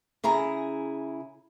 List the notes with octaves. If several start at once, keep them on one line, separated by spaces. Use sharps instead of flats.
C#3 E4 G#4 A#5